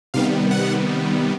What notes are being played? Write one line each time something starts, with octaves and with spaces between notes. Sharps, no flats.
C3 D#3 G3 B3 F5
F#5